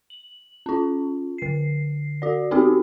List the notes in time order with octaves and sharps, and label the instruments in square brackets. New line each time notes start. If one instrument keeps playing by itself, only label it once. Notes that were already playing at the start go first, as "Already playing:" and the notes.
[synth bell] F#7
C#4 F4
D3 C7
F#4 D5
B3 C4 D#4 F#4 G4 A4